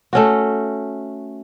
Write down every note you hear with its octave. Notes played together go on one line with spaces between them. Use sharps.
A3 C#4 F#4